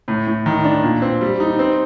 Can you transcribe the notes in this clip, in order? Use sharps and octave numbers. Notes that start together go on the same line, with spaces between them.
A2
A2
D#3
D4
A#2
C4
G3
D#4
C4